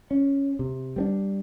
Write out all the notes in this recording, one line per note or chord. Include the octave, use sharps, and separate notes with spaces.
C#4
C3
G3 B3 D4